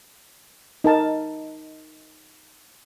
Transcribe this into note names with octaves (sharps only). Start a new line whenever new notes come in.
D#4 A#4 A5